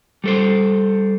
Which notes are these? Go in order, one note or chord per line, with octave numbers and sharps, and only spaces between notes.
G3 A4 C5